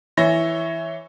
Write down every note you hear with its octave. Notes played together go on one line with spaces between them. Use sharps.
E3 C#5 E5 A#6